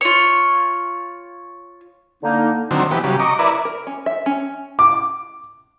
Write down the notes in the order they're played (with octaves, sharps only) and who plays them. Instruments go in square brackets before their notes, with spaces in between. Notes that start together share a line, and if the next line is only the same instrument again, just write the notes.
[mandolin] F4 C#5
[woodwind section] D3 A#3 D#4
[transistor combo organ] D3 D#3 F#3 C4
E3 B3 G4
C#3 F#3 G3
D#5 A#5 C#6 D6
E4 A#4 B4 D5
[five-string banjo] A#4
C#4
E5
C#4
[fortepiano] D6